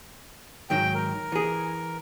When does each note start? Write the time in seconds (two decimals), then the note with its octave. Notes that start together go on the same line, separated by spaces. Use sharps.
0.70 G#2 D#3 F#3 G5
0.94 A#4
1.32 E3 G#4